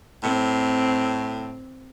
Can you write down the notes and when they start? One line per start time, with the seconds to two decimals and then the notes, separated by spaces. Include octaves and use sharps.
0.23 A2 C4